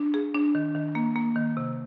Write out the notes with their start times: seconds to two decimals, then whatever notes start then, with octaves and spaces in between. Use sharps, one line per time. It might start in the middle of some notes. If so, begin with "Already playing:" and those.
Already playing: D4
0.14 G#4
0.34 D4
0.55 D#3
0.75 D#3
0.95 A#3
1.16 A#3
1.36 D#3
1.57 C3